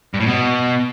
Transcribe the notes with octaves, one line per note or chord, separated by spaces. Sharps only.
G2
A2
B2